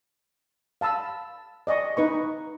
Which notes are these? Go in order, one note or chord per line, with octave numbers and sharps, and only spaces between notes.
F5 A5 B5 E6
D5 D#5 G#5 C#6
D#4 B4 C#6